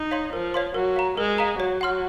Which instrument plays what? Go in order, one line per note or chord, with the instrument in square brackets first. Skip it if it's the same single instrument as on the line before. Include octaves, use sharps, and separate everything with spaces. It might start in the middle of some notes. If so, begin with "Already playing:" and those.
Already playing: [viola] D#4
[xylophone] C#5 F5 C6
[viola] F3 [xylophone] A#4
[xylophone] C#5 F5 C6
[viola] F#3 [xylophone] A#4
[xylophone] F5 A#5
[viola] G#3 [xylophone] A#4
[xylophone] F5 A#5
[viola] F#3 [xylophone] C#5
[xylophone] F#5 C6 F6